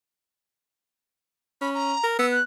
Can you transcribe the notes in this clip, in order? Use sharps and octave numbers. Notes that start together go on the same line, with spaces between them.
C#4 B5
A#5
A#4
B3 E6
F#6